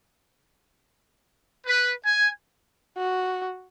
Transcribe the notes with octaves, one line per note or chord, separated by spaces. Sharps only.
B4
G#5
F#4